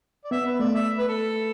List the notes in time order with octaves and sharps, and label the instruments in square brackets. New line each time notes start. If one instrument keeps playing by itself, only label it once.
[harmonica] D5
[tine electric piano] B3 [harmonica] E5
[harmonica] B4
[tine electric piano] A3 [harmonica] D5
[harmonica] E5
B4
A4